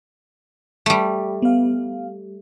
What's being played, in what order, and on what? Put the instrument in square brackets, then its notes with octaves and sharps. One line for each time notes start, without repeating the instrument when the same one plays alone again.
[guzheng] G3 A3
[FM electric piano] B3 F5